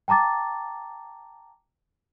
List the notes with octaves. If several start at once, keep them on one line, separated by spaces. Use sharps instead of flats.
G5 A5 A#5 D6 A6